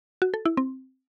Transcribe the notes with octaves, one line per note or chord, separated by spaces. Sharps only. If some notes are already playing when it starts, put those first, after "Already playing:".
F#4
A4
E4
C4